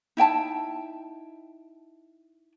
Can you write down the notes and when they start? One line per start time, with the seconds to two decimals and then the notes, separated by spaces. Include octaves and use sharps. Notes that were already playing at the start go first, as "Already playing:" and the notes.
0.17 D#4 E4 G5 A5